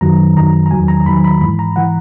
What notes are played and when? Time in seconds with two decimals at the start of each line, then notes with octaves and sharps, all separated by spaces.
0.01 F#2 D#3 F#3 A#5
0.36 F#2 D#3 F#3 A#5
0.66 A#5
0.71 E2 D#3 F#3 G#5
0.88 A#5
1.06 E2 D#3 F#3 B5
1.24 B5
1.41 G#2 E3 B5
1.59 A#5
1.76 E3 F#5